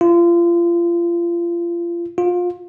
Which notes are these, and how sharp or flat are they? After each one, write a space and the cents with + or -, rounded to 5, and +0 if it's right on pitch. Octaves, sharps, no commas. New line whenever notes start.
F4 -30
F4 +25